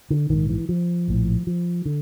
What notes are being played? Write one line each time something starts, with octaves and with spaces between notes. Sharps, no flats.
D3
A#1 G#2 D#3
E3
F3
A#1 A2
F3
D3